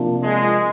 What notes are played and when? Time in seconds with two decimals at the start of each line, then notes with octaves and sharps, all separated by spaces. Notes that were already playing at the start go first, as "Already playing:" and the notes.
Already playing: C3 F3 A#3 D4
0.23 G#3